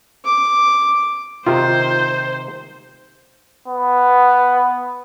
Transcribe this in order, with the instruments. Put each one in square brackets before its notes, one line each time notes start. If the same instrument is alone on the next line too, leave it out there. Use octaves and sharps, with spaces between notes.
[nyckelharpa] D6
[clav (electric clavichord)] C3 D#3 [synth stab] F4 [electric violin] C5
[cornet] B3